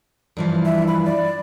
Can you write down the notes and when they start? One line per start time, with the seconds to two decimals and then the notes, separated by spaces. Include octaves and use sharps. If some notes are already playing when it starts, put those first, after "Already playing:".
0.37 G2 E3 F3
0.65 E5
0.88 B5
1.05 D5